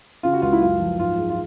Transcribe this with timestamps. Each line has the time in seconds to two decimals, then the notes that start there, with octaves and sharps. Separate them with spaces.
0.23 C#3 F4
0.33 F#4
0.42 C#2 F4
0.53 E4
0.61 F#2 F4
0.80 F3
0.98 G#2 F4
1.18 G#3
1.30 F4